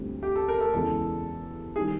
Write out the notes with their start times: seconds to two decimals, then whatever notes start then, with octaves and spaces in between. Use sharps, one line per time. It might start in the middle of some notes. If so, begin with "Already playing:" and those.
Already playing: D2 D3 G3 C4 F4
0.23 G4
0.36 A4
0.48 A#4
0.61 A4
0.74 E2 C#3 E3 G#3 A4
1.76 D#3 G3 G#4